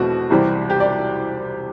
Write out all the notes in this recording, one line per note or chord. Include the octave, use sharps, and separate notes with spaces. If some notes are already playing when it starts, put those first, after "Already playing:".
Already playing: E2 B2 A3 C4 F#4
C2 C3 E3 G3 C4
G4
D5